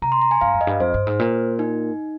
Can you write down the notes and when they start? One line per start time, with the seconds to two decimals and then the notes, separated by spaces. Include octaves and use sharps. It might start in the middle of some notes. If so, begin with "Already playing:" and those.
0.02 C3 A#5
0.12 C6
0.22 A#5
0.31 G#5
0.41 G2 F5
0.54 F2
0.61 D#5
0.67 G2
0.80 F2 C5
0.94 G2
1.07 G#2
1.19 A#2
1.59 D#4